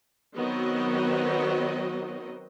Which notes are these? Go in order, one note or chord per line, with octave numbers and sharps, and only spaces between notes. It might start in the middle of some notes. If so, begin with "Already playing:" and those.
D#3 F#3 B3 C4 F#4 D#5